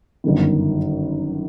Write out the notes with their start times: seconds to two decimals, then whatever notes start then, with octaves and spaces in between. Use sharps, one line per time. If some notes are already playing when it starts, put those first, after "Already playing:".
0.24 G1 F#2 D#3